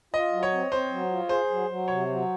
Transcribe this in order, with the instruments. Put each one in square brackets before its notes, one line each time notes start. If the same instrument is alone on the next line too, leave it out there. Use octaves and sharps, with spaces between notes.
[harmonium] F4 [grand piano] D#5
[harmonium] F#3
[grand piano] C#5
[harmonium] C4
[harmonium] C4 [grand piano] C5
[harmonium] F#3
F4
[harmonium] G#4 [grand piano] C5
[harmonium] F#3
F#3
[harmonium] C3 [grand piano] C#5
[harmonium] F#3